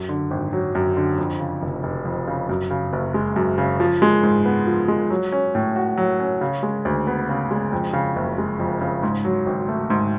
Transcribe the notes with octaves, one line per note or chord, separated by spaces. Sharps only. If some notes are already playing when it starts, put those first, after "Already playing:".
Already playing: F#2
D3
G#1
F#3
F#2
D3
F2
C#3
F1
F1
F2
C#3
F#2
C#3
F#1
G#3
F#2
C#3
F3
G#3
G#2
B3
F3
G#3
F#3
C#4
A2
F#4
F#3
C#4
C#3
G#3
D2
B3
C#3
G#3
F2
C#3
F#1
G#3
F2
C#3
G#2
F#3
G#1
A3
G#2